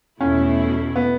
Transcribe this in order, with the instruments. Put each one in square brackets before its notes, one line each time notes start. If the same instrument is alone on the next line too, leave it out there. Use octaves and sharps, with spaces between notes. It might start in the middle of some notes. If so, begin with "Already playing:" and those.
[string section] E2 B2 A3 E4 [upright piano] C#4
[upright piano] B3